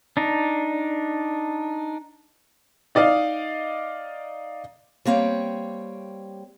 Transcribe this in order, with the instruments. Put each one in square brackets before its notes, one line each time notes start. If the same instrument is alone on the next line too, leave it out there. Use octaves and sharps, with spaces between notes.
[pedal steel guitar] D4 D#4
[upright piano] D#4 D5 D#5 F5
[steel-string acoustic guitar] G3 A#3 C4 C#5